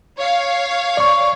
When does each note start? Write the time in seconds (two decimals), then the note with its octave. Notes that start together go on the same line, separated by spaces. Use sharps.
0.18 C#5 F5
0.97 D5 C#6